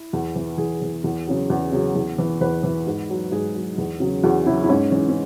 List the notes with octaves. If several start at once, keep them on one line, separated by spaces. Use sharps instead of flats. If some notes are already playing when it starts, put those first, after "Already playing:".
Already playing: E4
E2
E3
E2 G#4
E3
E2
C#3 F#3
E2
C#3 F#3
E2
E3
E2 B4
E3
G#2
F#3
G#2 G#4
F#3
E2
C#3 F#3
E2 F#4
C#3 F#3 E4
E4
G#2 C#4
E3 C#4
C#4